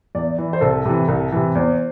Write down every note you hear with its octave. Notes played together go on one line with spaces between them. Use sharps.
E2 D5
E3
C5
C2 A4
C3 E3
C2
C3 E3
E2 C5